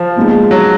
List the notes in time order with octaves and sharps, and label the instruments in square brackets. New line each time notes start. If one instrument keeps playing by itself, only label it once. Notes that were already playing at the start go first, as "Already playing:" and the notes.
Already playing: [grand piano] F3
[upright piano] A#2 G#3 B3 D#4
[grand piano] F#3